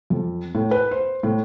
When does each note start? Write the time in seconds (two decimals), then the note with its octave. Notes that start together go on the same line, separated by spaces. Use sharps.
0.10 F2
0.55 A2
0.71 B4
0.91 C5
1.23 A2